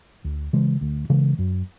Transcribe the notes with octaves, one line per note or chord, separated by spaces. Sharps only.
D2
C#3 E3 G#3
D2
C#3 E3 G#3
F#2